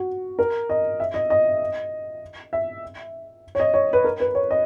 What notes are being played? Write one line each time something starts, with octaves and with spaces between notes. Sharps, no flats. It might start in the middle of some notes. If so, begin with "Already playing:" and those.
Already playing: F#4
A#4
D#5
E5
D#5
D#5
E5
C#5
D#5
C#5
B4
A#4
B4
C#5
D#5